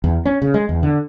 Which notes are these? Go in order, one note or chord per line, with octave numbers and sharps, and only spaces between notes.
E2
C#4
C#3
G#3
E2
D3